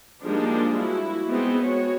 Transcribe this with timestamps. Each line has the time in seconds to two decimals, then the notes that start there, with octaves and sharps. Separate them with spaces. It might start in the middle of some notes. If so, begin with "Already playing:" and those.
0.24 F3 G3 G#3 A#3 D4 D#4
0.80 E4 F#4
1.28 G#3 B3 C4 D#4
1.64 F#4 C#5